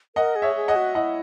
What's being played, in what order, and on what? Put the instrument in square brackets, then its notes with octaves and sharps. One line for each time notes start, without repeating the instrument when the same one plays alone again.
[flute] A#4 [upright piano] D#5 F#5
[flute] G#4
[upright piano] C#5 E5
[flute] G#4
[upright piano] D#5 F#5
[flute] F#4
[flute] E4 [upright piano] D#5 F#5